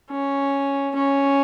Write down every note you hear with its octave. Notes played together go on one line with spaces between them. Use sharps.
C#4
C#4